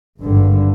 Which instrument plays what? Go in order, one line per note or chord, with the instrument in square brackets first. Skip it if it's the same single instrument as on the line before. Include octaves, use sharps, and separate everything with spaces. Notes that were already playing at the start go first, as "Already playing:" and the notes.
[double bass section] G#1 G2 D3